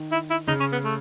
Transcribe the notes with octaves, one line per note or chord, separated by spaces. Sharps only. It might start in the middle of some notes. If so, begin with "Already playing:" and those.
Already playing: D#3
E4
E4
C#3 D#4
C#4
B3
A3